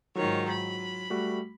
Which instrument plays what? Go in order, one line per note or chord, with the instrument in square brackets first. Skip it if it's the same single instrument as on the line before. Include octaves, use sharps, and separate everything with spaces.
[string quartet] G#2 D#3 C#5 [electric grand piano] F#3 F4
[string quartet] B5
[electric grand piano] G3 A3 F#4